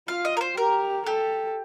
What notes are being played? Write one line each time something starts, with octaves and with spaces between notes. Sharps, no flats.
F4 F5
D#5
A#4
C5
G4 A#4
G4 A4